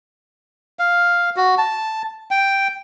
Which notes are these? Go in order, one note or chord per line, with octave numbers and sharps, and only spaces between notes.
F5
F#4
A5
G5